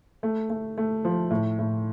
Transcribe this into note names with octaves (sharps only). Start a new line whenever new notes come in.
A3
A3
A3
F3
A2
A2